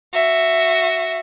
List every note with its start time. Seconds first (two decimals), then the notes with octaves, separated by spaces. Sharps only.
0.14 F#4 E5